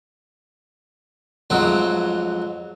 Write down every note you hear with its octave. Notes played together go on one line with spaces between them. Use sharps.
F2 G#2 F#3 A3 C4